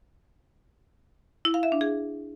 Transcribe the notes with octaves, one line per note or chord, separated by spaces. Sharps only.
E4
F5
E5
D4
G#4